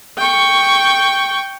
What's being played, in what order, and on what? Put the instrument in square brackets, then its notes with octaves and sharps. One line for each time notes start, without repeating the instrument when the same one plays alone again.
[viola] G5 C#6